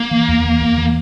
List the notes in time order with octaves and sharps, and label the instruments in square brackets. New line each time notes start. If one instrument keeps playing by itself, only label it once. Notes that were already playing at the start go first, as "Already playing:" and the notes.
Already playing: [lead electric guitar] A#3
[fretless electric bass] E3
E2
E3
E2
E3